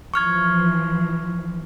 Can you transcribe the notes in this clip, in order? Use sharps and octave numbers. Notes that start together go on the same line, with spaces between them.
E3 F3 C#6 F6 G#6